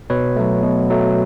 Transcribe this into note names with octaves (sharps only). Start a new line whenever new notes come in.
B2 B4 C#5
F#3 A3
B2
F#3 A3